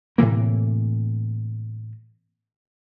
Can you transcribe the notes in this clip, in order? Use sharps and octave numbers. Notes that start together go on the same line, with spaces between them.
A2 C3 E3 A#3